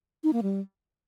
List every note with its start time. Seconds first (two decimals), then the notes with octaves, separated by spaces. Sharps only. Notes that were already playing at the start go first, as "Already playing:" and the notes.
0.24 D#4
0.33 A#3
0.43 G3